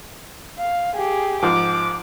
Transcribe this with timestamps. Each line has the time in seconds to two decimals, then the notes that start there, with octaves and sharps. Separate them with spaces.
0.59 F5
0.96 G4 G#4
1.42 G#2 F3 D6